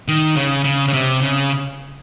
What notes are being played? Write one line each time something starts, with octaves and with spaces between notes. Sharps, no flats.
D#3
C#3
C#3
C#3
C3
C#3